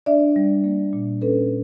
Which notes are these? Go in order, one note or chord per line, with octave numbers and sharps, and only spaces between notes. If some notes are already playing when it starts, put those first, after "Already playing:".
D4 D5 E5
G3
A#3
A#2
C#4 A4 B4